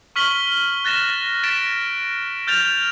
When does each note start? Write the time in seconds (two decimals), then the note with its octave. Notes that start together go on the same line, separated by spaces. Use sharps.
0.16 C#6 F6 B6 F#7 G7
0.85 F#6 A6 A#6 E7
1.43 A6 B6 D7 E7
2.47 F6 G6 A6 F7